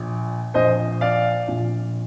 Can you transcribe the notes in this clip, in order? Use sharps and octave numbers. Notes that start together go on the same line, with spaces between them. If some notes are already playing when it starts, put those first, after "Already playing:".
Already playing: A#1 A#2
A#1 A#2 C5 D#5
D5 F5
A#1 A#2